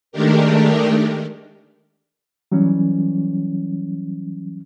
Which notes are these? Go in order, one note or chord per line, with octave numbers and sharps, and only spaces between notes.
D#3 G#3 A3 D4 G4 A#4
E3 F#3 G3 C#4